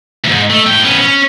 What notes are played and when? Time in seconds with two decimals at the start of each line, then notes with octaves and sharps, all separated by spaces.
0.24 D2 G#2
0.50 A3
0.66 A2 G5
0.83 B3 C#4
1.01 C#4